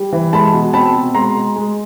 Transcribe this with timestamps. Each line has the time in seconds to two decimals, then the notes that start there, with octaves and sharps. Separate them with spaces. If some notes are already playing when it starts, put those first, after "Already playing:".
Already playing: G3
0.13 E3
0.33 G#3 A5 B5
0.53 B2
0.73 C4 A5 B5
0.95 B2
1.15 G#3 A#5 C6
1.35 G#3
1.56 G#3